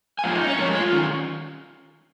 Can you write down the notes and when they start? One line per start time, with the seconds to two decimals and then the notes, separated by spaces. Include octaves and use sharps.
0.19 G#5
0.24 G#2 F3 A#3 C#4 F4 F5
0.35 D#4 D#5
0.47 C#4 C#5
0.58 G#2 F3 A#3 C#4 A#4
0.70 G#3 G#4
0.81 F4
0.93 D#3 C#4 D#4